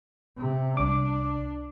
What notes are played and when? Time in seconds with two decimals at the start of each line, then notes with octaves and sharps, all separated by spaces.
0.37 C3
0.77 C2 D4 D6